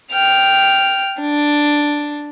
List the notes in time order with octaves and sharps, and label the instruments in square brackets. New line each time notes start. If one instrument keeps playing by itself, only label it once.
[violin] G5 F6
D4